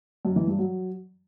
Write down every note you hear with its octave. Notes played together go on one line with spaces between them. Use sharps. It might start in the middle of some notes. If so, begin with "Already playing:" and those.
F#2
E3
G2
F#3